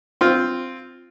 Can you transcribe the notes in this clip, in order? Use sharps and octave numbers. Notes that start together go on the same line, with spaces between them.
C4 F4